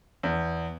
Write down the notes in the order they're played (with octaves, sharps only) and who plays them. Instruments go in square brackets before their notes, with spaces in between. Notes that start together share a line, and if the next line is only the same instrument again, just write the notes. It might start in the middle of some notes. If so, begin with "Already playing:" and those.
[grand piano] E2